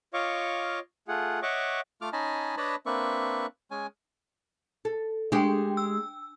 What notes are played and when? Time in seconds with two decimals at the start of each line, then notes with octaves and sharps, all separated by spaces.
0.14 F4 C#5 D#5 F5 C#6 D6
1.08 A3 F4 G#4 F#5
1.42 C#5 D#5 E5 F#5 C#6 D6
2.01 A3 F4 D6 F6
2.13 C#4 D#4 D#5 G#5 A5 B5
2.57 D4 B4 C#5 D#5 A5 B5
2.86 A#3 C4 D4 B4 E5 C#6
3.71 G#3 C#4 G#5
4.85 A4
5.32 G#3 D4 G4 G5
5.77 E6